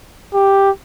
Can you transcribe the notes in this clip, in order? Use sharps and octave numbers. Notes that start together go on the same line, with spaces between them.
G4